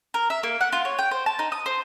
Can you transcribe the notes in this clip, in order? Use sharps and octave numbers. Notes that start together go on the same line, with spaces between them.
A#4
E5
A#3
F#5
F4
C#5
G5
C5
A5
D#4
D#6
C5